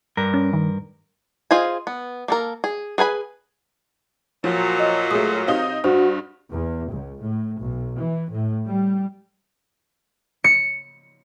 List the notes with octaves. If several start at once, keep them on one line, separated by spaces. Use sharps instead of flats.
G2 A#4
C#4
D#3
F4 G#4 C5 D#5 G#5
B3
A#3 A4 A#4
G#4
G#4 B4 G#5 B5
A#2 F3 F#3
D#5
G#3 A3 D#6
C4 D#4 G4 F5 D#6
G2 F#4 C5
E2
C#2
A2
B1
E3
A2
G3
C#7